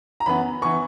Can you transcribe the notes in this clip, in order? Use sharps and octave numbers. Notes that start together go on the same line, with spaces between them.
A#5
F#2 E3 B3 B5
E3 B3 C#6